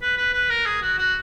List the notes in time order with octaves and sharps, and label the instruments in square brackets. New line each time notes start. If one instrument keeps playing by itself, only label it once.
[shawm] B4
B4
B4
A#4
G#4
F#4
F#4